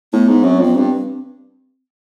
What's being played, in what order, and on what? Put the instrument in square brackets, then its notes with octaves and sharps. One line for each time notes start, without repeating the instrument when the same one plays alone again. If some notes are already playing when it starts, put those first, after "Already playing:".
[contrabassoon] A2 [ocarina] B3
[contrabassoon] G#2
[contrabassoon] F#2 [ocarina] C4
[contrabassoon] F2 [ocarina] B3
[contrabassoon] G2 [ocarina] C4